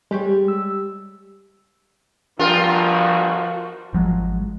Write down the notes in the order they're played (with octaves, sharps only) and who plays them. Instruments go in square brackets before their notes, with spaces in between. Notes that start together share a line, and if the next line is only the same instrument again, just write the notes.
[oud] G3 G4 C#5 [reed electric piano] G#3
[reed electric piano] E6
[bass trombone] G1 [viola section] F3 F#4 [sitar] F4 A#4
[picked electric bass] G#1 F3 F#3 G#3